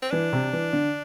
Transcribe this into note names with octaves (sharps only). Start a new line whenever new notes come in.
C4
E3 D4
C3
E3
D3